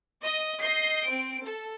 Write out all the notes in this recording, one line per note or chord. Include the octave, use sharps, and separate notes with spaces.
D#5
D#5 G6 C7
C4 D7
A4